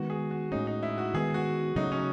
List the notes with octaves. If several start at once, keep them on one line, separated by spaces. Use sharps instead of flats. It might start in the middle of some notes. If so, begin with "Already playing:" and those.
Already playing: D#3 G#3 B3 F#4
G#4
F#4
A2 G#3 C#4 D#4
D#4
E4
F#4
D#3 G#3 B3 G#4
F#4
C#3 F#3 A3 D#4
C#4